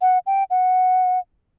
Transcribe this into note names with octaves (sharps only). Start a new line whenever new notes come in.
F#5
G5
F#5